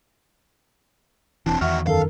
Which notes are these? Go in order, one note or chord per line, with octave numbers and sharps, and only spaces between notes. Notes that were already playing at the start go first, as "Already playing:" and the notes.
E1 E3 C4 D4 A5
E2 D#3 F#4 E5 F#5 F6
F#2 D#3 A4 A#4 F5